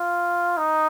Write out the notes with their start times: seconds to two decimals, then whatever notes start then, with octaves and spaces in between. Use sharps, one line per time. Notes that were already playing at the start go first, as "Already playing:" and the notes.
Already playing: F4
0.57 D#4